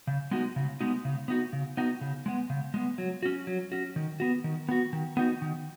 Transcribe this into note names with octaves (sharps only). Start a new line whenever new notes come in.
C#3
G#3 B3 D#4 F#4
C#3
G#3 B3 D#4 F#4
C#3
B3 D#4 F#4
C#3
B3 D#4 F#4
C#3
G#3 B3
C#3
G#3 B3
F#3
C#4 F#4
F#3
C#4 F#4
D#3
B3 F#4
D#3
B3 F#4
D#3
B3 D#4 F#4
D#3